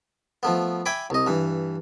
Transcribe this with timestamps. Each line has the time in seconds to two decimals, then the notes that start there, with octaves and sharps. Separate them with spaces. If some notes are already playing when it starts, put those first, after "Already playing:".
0.43 F3 A3 B3
0.86 E5 G5 G#5 B5 D6
1.10 C2 D#5
1.27 G2 E3